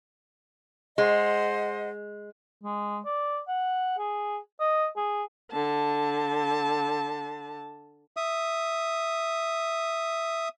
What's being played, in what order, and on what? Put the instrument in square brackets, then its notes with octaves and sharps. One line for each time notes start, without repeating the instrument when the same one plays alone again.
[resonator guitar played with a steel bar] G#3 [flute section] C5 D#5 F#5
[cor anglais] G#3
D5
F#5
G#4
D#5
G#4
[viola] D3 A5
[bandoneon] E5 D#6